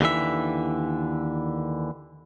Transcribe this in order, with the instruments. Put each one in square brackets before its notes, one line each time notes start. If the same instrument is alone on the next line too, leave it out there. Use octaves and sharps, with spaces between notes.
[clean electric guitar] D#2 D3 E3 E5